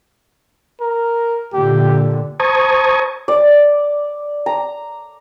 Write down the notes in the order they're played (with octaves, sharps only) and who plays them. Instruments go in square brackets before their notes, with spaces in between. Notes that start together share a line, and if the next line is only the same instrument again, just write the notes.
[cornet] A#4
[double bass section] A#2 D3 [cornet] G4
[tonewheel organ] C5 A5 A#5 C#6 D#6 G#6
[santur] D5
A#5